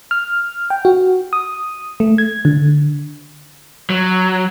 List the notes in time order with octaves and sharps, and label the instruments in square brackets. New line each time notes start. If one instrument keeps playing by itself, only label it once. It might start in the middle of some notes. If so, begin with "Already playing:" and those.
[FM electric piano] F6
G5
F#4
D#6
A3
G#6
D3
[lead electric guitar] F#3